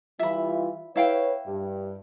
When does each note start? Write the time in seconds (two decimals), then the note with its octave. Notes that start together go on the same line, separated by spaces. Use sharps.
0.19 E3 G3 F4 E5 B5
0.96 E4 B4 C#5 F5 G5
1.46 G2 G4